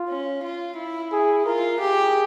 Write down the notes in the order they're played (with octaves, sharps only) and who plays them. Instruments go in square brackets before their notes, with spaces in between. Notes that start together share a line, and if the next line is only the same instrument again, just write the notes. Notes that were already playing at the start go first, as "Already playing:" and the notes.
Already playing: [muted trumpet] F4
[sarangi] C#4
F4
E4
[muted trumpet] G#4
[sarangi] F4 [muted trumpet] A#4
[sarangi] G4 [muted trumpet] G#4